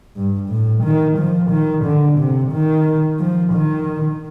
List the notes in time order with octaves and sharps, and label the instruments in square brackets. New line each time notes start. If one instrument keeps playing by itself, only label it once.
[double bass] G2
A2
D#3
F3
D#3
D3
C3
D#3
F3
D#3